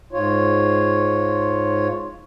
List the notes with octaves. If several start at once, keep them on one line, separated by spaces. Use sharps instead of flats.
G#2 F4 C#5